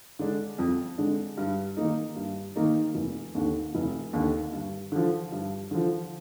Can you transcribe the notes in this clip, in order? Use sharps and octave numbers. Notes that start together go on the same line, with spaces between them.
D3 G#3 D4
F2
D3 G#3 D4
G2
D#3 A#3 D#4
G2
D#3 A#3 D#4
F1
D#2 D3
F1
D#2 D3
G2
D3 F3
G2
D3 F3